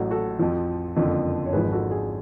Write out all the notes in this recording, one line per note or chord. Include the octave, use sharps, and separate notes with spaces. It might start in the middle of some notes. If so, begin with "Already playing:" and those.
Already playing: A1 A2 F#3 F#4 A4
F#4 A4
F2 F3
F#1 F2 D3 F3
C#5
G#1 G#2 F3 G#4 B4
F#4 A4
G#4